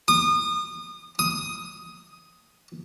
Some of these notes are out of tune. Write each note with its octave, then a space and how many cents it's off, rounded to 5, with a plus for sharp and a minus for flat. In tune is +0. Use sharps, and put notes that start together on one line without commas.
D#6 -30
D#6 +10